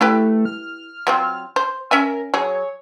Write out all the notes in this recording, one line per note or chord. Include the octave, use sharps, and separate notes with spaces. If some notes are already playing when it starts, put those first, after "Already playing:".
A3 E4 G4 B4
F6
F#3 C4 F4
C5
C#4 A#4 E5 G#5
F#3 G#4 C#5